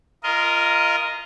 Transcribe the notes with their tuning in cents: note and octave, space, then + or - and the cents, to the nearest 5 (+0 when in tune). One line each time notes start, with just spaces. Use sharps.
F4 -25 A#4 +0 D#5 +0